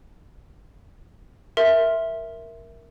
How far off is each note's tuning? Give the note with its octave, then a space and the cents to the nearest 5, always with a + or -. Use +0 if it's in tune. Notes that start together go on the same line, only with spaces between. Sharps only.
A#4 +0 E5 +0 C6 +5